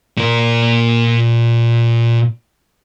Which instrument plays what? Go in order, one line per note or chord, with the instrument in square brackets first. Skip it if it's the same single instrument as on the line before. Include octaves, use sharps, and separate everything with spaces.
[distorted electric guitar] A#2 A#4